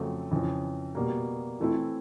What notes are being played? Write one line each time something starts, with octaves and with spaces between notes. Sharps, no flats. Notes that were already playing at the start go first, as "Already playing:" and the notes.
Already playing: F2 C#3 F#3 A3 C4
F2 C#3 E3
B2 G3 A#3
E3 A3 C4 E4